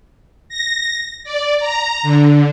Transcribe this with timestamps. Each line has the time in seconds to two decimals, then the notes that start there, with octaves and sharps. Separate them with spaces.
0.49 A#6
1.24 D5
1.60 A#5
2.03 D3